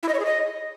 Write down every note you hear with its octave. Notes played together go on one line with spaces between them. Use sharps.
E4
D#5
C#5
G#4
D#5